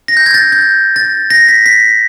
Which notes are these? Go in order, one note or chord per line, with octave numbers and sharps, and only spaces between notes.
A#6
G6
G#6
A6
G6
A6
A#6
B6
B6